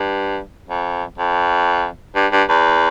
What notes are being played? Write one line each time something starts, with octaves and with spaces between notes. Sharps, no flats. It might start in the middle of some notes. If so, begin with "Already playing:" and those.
Already playing: G2
F2
F2
G2
G2
E2